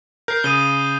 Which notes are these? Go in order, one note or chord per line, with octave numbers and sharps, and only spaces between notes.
A#4 G6 C7
C#3 D#6 D#7 G7